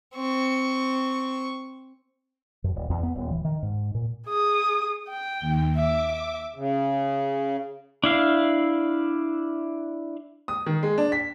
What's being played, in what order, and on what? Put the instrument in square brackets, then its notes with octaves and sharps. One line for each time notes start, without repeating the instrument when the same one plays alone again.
[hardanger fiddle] C4 C#6
[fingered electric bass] F#2
D#1
E2
B3
D#1
E3
D#3
G#2
A#2
[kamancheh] G#4 D#6
G5
[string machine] D#2
[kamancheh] E5 [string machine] D6
[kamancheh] E5
[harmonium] C#3
[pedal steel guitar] D4 E4 F5
[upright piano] D#6
D#3
G#3
D4
B6